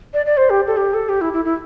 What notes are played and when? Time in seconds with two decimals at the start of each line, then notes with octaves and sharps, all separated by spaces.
0.14 D5
0.26 D5
0.37 C5
0.50 G4
0.67 A4
0.77 G4
0.94 A4
1.09 G4
1.21 E4
1.33 E4
1.45 E4